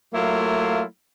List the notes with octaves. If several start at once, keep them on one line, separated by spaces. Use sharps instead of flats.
F#3 A3 A#3 E4 F4